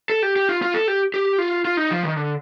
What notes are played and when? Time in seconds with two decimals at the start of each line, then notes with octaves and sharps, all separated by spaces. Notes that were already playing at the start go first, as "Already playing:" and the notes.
0.10 A4
0.23 G4
0.36 G4
0.49 F4
0.62 F4
0.74 A4
0.88 G4
1.14 G4
1.38 F4
1.65 F4
1.77 D#4
1.91 F3
2.03 D#3
2.16 D3